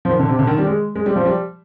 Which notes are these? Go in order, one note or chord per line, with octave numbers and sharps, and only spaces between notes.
F3
D#3
D3
C3
D3
D#3
G3
G#3
G#3
G3
F3
G3